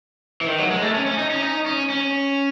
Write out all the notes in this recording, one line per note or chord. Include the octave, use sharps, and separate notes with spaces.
E3
D#3
F#3
G#3
A3
C#4
C#4
D#4
C#4
D#4
C#4
C#4